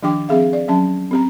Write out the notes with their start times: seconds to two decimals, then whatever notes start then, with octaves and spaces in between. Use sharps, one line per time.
0.03 D#3 F3 D4 G4 G5 D6
0.29 F3 C4 G#4 E5 F5
0.53 D5
0.68 F#3 C#4 A5
1.11 C4 G4 A#5